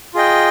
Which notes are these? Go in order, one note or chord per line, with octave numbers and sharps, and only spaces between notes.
F4 G#4 D#5 G5